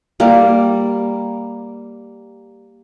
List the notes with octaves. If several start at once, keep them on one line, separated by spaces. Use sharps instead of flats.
G3 A#3